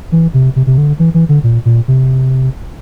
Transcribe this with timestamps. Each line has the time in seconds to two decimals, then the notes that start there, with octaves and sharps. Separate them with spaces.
0.12 E3
0.34 C3
0.56 C3
0.67 C3
0.78 D3
0.99 E3
1.14 E3
1.29 D3
1.43 A#2
1.65 A#2
1.88 C3